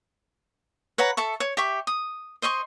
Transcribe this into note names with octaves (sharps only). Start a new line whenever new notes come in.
B4 C#5 F#5 A#5
A4 E5 C#6
C#5
G4 E5 C#6
D#6
C5 D#5 C6 C#6